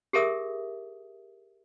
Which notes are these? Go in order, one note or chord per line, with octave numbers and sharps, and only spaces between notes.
G4 G#4 A#4 E5 D#6